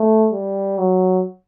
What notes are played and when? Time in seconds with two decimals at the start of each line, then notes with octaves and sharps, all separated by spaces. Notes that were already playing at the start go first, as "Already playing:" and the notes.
Already playing: A3
0.32 G3
0.78 F#3